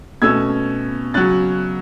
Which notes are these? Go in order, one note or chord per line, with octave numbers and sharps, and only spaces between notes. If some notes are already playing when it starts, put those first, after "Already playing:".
B2 A3 C#4 E6 G#6
C#3 F#3 C#4 F#6 A6